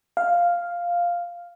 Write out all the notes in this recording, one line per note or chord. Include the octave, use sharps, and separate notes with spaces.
F5